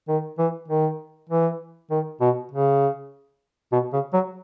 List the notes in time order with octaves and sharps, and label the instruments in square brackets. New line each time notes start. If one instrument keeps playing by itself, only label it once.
[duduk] D#3
E3
D#3
E3
D#3
B2
C#3
B2
C#3
F#3